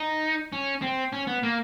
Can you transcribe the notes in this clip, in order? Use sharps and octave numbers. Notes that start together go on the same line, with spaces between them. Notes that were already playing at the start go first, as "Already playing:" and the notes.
Already playing: D#4
C#4
C4
C#4
B3
A#3